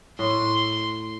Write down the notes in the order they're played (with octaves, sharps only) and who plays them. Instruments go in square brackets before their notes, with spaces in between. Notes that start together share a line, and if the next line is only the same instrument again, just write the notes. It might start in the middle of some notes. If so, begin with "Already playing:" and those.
[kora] A2 [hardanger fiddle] C6